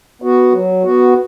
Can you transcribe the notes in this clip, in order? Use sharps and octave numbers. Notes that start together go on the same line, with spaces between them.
B3 F#4
F#3
B3 F#4